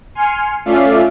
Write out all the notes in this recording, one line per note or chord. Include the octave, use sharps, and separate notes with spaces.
G#5 C6 F6 C7 C#7
A3 C#4 F4 D5 E5 F5